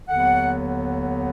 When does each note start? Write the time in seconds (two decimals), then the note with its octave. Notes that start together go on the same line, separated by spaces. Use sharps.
0.08 D#2 D3 F#3 B3 F#5